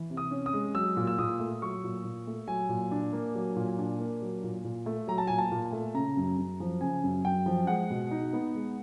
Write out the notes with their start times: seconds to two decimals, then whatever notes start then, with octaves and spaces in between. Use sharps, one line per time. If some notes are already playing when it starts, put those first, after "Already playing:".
Already playing: E3
0.10 C3
0.17 D#6
0.31 C#4
0.46 D#6
0.53 G#3
0.75 F#3 E6
0.97 A#2
1.07 E6
1.18 A#2 D#6
1.39 A3
1.62 F#3 C#6
1.84 A#2
2.05 A#2
2.27 A3
2.48 F#3 G#5
2.69 A#2
2.91 D4
3.13 A#3
3.35 F#3
3.56 A#2
3.78 D4
4.00 A#3
4.22 F#3
4.44 A#2
4.65 A#2
4.86 A3
5.08 F#3 A#5
5.18 A5
5.27 A#2 G#5
5.38 A5
5.51 A#2
5.72 A3
5.94 C#3 A#5
6.17 F#2
6.38 F#2
6.60 F3
6.81 C#3 G#5
7.04 F#2
7.24 F#2 G5
7.46 F3
7.67 G#3 F#5
7.90 B2
8.11 D#4
8.33 B3
8.55 G#3